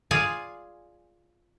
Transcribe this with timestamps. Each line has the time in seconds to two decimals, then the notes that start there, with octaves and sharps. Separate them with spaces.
0.11 F4 G#4 D5 F5 G#5